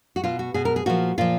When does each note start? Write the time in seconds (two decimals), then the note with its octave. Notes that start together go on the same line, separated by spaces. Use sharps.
0.16 F#4
0.24 B2 F4
0.39 F#4
0.54 B2 G#4
0.65 A#4
0.76 G#4
0.86 A#2 F3 F#4
1.18 A#2 F3 F4